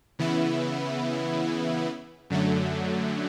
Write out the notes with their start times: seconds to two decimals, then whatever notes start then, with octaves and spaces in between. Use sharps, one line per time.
0.19 C#3 E3 B3 E4
2.30 F#2 D3 F#3 A3